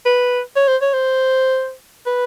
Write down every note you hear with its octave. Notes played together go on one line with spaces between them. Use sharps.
B4
C#5
C5
C#5
C5
B4